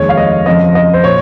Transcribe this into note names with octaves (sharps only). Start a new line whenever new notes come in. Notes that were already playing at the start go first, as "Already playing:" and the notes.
Already playing: F1 D#2 D#3 G#3 C#5
F5
D#5
F2 C#3 F3 D#5
D#5
C5
A#2 C#5